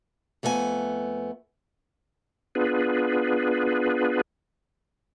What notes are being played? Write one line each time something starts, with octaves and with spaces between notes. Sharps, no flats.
F2 A3 B3 E4 G#5
B3 D4 F4 G#4 B4